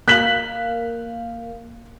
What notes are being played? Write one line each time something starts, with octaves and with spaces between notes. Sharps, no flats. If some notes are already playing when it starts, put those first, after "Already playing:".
A#3 A#4 F5 F#6 B6 F#7